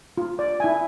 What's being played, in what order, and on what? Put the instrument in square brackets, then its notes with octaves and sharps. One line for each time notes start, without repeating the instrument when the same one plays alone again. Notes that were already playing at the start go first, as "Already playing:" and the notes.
[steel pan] F4
D5
E4 E5 G#5